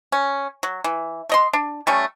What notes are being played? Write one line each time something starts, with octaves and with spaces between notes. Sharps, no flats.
C#4
F#3
E3
A3 D#5 C6
D4
G3 A3 C#4